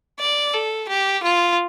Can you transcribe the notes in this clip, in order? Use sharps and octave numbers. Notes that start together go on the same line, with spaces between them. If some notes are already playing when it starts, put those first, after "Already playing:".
D5
A4
G4
F4